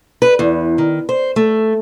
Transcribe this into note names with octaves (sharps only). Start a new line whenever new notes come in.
B4
E2
D#3
C5
A3